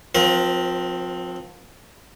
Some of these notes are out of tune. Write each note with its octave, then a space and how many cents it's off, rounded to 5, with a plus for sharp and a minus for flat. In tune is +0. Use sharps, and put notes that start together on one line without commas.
F3 +35 C4 +0 A#4 +40